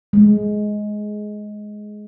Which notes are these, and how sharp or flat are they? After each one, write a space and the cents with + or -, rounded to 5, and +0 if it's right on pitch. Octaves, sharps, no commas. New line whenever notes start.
G#3 +15